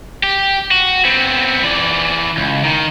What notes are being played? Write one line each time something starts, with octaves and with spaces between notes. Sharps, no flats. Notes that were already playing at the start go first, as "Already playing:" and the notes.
G4
F#4
B3 C4
E3 D5
C#2
D#3